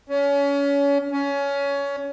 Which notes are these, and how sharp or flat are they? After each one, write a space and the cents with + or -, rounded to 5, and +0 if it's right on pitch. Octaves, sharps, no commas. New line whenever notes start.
C#4 +30
C#4 +20